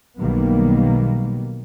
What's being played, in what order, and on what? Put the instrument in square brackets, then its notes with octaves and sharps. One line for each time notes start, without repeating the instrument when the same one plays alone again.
[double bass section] B1 D#3 F#3 G3 A#3 B3